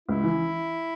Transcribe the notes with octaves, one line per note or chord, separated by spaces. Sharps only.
C#2 E4
E3